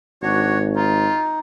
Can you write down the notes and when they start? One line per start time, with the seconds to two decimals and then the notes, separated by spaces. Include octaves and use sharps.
0.22 G#1 D4 F#4 C#5
0.76 D#4 F4